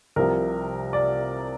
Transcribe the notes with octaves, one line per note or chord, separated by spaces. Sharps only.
C2 C3 F3 A#4
D5